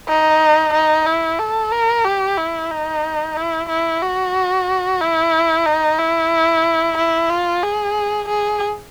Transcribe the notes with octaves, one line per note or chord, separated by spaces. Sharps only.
D#4
D#4
E4
A4
A#4
G4
E4
D#4
E4
E4
F#4
E4
D#4
E4
E4
F4
G#4
G#4